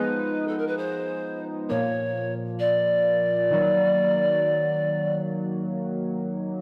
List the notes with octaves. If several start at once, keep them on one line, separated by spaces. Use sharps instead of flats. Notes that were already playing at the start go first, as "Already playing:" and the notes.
Already playing: F3 G#3 B3 D#4 B4
A4
A#4
B4
C5
A#2 F3 A#3 C#5
D5
D#3 F#3 A#3